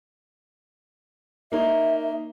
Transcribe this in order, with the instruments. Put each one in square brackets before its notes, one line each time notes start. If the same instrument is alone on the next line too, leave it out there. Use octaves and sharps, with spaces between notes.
[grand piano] A#3 D#4 C#5 [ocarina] E5